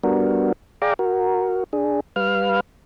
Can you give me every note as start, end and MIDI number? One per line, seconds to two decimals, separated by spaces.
0.04 0.52 55
0.04 0.52 59
0.04 0.52 62
0.04 0.52 66
0.04 0.52 70
0.82 0.94 68
0.82 0.94 74
0.82 0.94 77
0.82 0.94 79
0.82 0.94 82
0.82 0.94 86
0.99 1.64 66
0.99 1.64 70
1.73 2.00 62
1.73 2.00 68
2.16 2.60 55
2.16 2.60 71
2.16 2.60 77
2.16 2.60 89